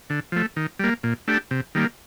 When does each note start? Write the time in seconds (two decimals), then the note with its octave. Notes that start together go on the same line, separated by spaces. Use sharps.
0.10 D3
0.32 F3 A3
0.56 D#3
0.79 G3 A#3
1.03 A#2
1.28 A3 D4 G4
1.51 C3
1.75 D#3 G3 A#3